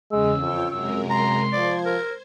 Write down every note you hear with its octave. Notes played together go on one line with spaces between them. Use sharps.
E2 C#3 G#3 C#4 E6
F2 F4 C#5 G5
F#2 C3 G#3 A#4 E6
A#5 C6
F3 C5 D5 G#6
A#4